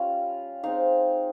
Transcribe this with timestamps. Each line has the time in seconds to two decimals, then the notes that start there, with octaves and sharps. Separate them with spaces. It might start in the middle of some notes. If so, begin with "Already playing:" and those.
Already playing: G3 C#4 F4 F5
0.64 G#3 C4 D#4 F5